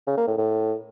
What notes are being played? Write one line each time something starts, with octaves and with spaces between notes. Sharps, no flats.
C#3
A#3
A2
A2